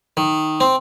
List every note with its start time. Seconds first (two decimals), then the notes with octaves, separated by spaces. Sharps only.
0.17 D#3
0.60 C4